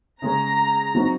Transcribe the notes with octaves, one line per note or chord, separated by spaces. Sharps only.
C#3 G#3 C#4 A#5
F#3 C4 D#4 F#4